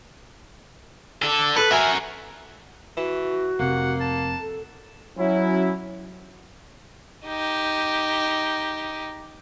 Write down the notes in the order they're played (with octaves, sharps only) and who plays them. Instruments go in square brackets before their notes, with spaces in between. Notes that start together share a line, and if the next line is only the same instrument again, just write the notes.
[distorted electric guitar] D3 A4
[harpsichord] A4 [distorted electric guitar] B4
[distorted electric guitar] F#4 A#4 [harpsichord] E5 G#5
[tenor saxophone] E3 [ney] F#4
[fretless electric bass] F1 C3 [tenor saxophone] A#3 [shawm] F#5
[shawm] A5
[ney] A4
[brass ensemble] F#3 C#4 E4
[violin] D#4 G4